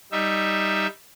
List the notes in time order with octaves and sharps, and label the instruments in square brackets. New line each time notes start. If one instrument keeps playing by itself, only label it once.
[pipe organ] G3 D#4 E5